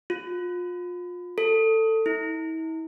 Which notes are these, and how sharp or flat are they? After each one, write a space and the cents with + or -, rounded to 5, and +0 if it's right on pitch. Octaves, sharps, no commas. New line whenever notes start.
F4 +30
A4 +20
E4 -40